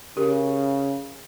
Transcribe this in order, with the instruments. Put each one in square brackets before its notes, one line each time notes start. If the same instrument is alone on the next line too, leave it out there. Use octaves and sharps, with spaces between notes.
[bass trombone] C#3 [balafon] G4 A#4